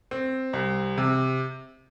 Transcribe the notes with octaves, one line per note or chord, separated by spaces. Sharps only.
C4
C2
C3